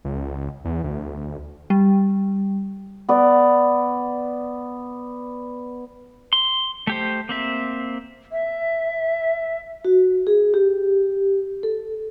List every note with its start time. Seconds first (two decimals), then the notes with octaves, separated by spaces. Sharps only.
0.05 C#2
0.65 E2
0.84 D2
1.70 G3
3.09 B3 D5
6.33 C6
6.87 A3 G4 C5
7.29 A#3 C4 E5
8.32 E5
9.85 F#4
10.27 G#4
10.54 G4
11.63 A4